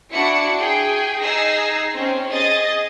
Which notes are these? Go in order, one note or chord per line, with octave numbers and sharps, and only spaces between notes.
D4 E4 F#4 F#5 C#7
G#4 G5
D#4 G#4 E6 A#6 C7
C4 C#4
G#4 D#5 D#6 A6